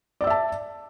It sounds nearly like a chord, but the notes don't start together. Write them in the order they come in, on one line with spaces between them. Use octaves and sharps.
D5 E6 E5 A5